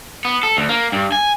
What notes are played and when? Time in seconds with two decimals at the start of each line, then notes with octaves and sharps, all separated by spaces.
0.25 B3
0.43 A4
0.57 D2
0.69 A#3
0.92 G2
1.12 G#5